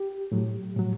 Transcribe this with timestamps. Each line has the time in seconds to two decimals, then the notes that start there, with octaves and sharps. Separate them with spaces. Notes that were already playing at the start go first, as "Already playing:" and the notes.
Already playing: G4
0.32 A2 F#3
0.76 A2 F#3